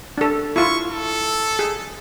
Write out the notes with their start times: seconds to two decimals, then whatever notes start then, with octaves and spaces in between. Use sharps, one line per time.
0.18 D4 A4
0.56 E4 F4 C#6
0.89 A4
1.59 G#4